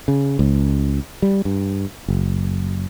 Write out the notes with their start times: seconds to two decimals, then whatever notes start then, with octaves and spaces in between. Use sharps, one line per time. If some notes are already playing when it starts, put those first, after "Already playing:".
0.08 C#3
0.39 C#2
1.22 G3
1.45 G2
2.08 F#1